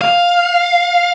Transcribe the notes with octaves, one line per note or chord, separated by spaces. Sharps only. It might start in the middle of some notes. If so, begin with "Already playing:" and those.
F5